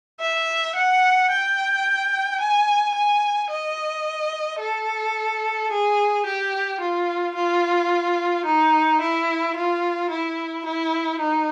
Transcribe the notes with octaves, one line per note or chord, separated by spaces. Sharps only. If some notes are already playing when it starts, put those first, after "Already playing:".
E5
F#5
G5
G#5
G#5
D#5
A4
G#4
G4
F4
F4
D#4
E4
F4
E4
E4
D#4